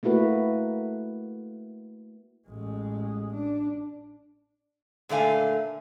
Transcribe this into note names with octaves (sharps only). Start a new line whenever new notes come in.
A3 A#3 E4 F#4 B4
A1 G#3
D4
A#2 D3 A3 F5 G#5